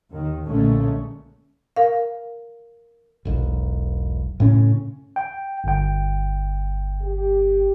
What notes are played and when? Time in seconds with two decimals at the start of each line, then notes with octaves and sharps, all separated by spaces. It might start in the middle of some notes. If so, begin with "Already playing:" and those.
0.11 D#2 D#3
0.47 B1 A#2 D3 G#3 A3 C#4
1.76 A#4 F5
3.25 E1 B1
4.40 A2 C#3 C#4
5.16 G5
5.64 G1 G5
7.02 G4